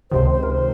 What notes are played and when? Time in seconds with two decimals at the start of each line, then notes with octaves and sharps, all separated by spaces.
0.11 C#2 C3 D#3 C5
0.31 C5
0.43 A#4
0.50 C5